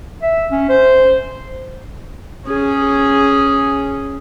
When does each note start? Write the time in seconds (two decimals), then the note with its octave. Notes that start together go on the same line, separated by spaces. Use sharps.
0.22 E5
0.51 C#4
0.69 C5
2.47 C#4 G#4